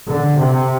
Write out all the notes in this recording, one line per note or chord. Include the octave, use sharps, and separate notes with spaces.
D3
C3